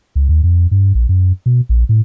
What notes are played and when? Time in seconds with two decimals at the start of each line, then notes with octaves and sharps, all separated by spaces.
0.16 C#2
0.29 D#2
0.43 F2
0.71 G2
0.95 A#1
1.09 F#2
1.46 B2
1.69 A#1
1.89 A2